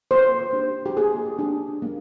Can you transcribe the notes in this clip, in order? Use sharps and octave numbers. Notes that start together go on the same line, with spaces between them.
A#3 C5
D4 G4
G4
A#3 G#4
D4 G4
A#3